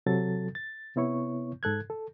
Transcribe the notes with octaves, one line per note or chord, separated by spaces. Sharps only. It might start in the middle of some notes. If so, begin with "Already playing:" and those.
C3 F#3 A4 A6
A6
C3 B3 E4 C#5 C#6
G#2 A4 F#6 G#6
A4